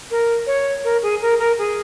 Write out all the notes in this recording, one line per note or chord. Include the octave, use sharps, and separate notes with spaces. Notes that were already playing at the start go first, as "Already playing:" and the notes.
A#4
C#5
A#4
G#4
A#4
A#4
G#4